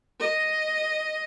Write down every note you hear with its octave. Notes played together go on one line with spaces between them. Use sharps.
D#5